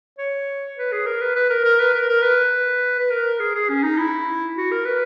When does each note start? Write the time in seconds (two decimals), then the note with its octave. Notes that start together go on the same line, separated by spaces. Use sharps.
0.18 C#5
0.78 B4
0.92 G#4
1.06 A#4
1.21 B4
1.36 B4
1.50 A#4
1.64 A#4
1.79 B4
1.94 A#4
2.09 A#4
2.23 B4
2.99 B4
3.11 A#4
3.40 G#4
3.55 G#4
3.69 C#4
3.83 D#4
3.98 E4
4.57 F#4
4.72 A#4
4.85 B4